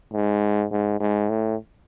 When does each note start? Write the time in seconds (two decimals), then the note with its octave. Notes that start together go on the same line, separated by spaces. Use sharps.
0.13 G#2
0.72 G#2
1.00 G#2
1.29 A2